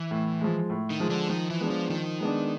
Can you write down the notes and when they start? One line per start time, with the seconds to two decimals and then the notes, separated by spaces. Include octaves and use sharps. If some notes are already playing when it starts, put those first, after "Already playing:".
Already playing: E3 E4
0.11 A2
0.41 F3 G#3
0.70 A2
0.90 D#3 D#4
1.00 F3 G#3
1.10 D3 D4
1.29 D#3 F3 D#4
1.50 E3 E4
1.60 G#3 B3 D4
1.70 F3 F4
1.89 D#3 F3 D#4
2.20 G#3 B3 D4